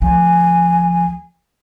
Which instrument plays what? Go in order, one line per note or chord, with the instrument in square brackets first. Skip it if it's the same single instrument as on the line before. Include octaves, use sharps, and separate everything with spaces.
[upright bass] D2 F3 [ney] G#5